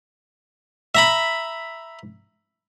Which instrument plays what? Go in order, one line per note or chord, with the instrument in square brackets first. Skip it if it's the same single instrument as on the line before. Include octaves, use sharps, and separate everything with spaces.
[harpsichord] E5 A#5 B5